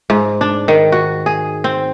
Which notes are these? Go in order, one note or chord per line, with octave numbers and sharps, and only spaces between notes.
G#2
D4
D#3
F#4
G#4
C4